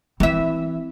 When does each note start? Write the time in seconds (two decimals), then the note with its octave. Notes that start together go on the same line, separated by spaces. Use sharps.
0.20 E3 C4 E4 E5